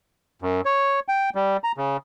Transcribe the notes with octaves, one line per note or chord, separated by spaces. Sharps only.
F#2
C#5
G5
G3
A#5
C#3